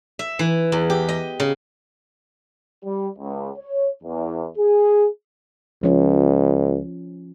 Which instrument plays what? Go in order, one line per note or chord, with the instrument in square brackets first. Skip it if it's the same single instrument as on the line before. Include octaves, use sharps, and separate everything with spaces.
[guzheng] E5
E3
E2
G4
D#5
C#3
[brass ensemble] G3
C#2
C#5
E2
G#4
[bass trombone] C#2 [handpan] F3 C#4